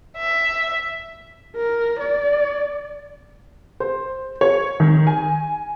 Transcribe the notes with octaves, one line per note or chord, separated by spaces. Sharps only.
E5
A#4
D5
C5
C#5
D#3
G#5